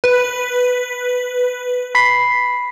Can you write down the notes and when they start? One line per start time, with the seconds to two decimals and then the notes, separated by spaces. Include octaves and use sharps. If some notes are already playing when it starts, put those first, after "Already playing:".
0.04 B4
1.95 B5 B6 C7